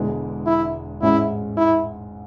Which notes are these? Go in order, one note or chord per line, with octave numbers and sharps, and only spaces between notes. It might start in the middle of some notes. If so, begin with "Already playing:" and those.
Already playing: E1 E2 D3 G#3 B3
E4
A1 G#2 G#3 C#4 E4
E4